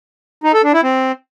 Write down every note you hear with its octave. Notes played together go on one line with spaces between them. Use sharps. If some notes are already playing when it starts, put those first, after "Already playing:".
D#4
A4
D4
E4
C4